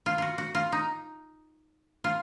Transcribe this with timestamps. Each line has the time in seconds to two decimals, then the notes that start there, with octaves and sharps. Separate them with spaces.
0.06 F4
0.18 F4 F#4
0.38 F#4
0.55 F4
0.72 D#4
2.04 F4